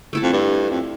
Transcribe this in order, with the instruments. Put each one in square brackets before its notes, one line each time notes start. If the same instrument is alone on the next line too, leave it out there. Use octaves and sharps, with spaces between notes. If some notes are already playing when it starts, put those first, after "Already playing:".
[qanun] A3 E4 A4
[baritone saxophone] F2
G2
F2